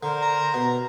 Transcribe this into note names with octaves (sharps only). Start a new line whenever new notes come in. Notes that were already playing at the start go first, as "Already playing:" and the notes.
D3 A#4 C5
A#5
B2